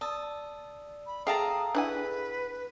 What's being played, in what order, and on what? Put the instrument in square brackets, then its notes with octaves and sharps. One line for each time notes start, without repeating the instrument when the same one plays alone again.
[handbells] D5 D#6 E6 [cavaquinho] A5
[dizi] B5
[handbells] G#4 A4 [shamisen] E5 G5 [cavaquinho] F5 A5 A#5 [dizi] D#6
[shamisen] D4 E4 G#5 [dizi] B4 [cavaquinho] F#5